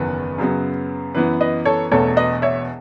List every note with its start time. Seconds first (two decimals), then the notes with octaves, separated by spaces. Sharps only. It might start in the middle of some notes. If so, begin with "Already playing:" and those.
Already playing: F#1 E2 D#3 F#3 B3 B4
0.38 F#2 C#3 F#3 B3
1.15 F#2 E3 B3 B4
1.41 B4 D#5
1.65 A4 C#5
1.91 E1 E2 B2 A3 A4 C#5
2.16 B4 D#5
2.42 C#5 E5